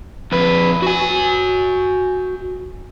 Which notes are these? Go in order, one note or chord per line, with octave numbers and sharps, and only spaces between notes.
F2 B4
F#4 G#5